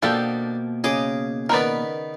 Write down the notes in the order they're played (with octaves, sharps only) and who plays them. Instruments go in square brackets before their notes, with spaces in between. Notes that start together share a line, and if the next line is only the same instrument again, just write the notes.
[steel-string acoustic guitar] B2 A#3 [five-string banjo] F3 G4 A4 [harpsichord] D4
[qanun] C#3 D#5 [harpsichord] G#4 D6
[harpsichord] D#3 B3 [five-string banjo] A#4 B4 D5